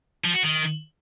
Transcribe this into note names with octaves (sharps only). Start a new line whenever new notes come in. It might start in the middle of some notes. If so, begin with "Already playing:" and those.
F3
F#4
D#3